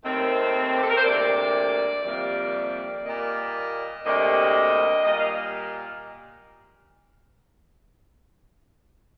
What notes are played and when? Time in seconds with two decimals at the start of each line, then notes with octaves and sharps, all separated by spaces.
0.04 D#2 D#3 A3 C4
0.76 G4
0.83 A4
0.90 A#4
0.97 C5
1.05 D2 C3 G3 A#3 D5
2.05 F2 C3 D#3 G3 A#3 D5
3.05 A#2 G3 A#3 D#5
4.05 D2 C3 G3 A#3 D#5
5.05 A#2 G3 A#3 D#5
5.17 F5